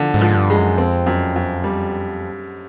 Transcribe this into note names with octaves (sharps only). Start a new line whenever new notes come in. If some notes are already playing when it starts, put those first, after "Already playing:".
Already playing: D3 F3
G#2
F3
G2
G#3
F#2
F2 C4
F#2
F#2
G3